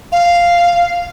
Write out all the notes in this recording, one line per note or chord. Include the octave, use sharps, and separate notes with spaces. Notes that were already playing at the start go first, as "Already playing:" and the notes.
F5